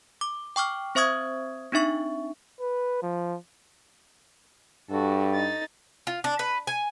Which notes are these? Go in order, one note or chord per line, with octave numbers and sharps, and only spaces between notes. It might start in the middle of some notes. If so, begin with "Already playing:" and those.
D6
G5 C#6 D6 F6
C4 C5 E5 C#6 D#6 G#6
C4 D4 D#4 E5 C#6
B4
F3
G2 F#4 A4
D#4 A6
F4
D4
B4
G#5